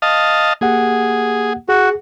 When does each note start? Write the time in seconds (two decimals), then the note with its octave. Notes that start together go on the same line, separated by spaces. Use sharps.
0.02 D#5 F5 A5
0.61 A#3 G4 G#4 F#5
1.69 F#4 G#4